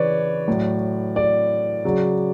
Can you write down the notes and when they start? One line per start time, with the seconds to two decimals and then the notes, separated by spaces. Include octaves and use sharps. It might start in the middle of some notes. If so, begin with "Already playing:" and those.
Already playing: C#3 E3 B4 C#5 D5
0.48 A2 F#3
1.16 D5
1.84 C#3 F#3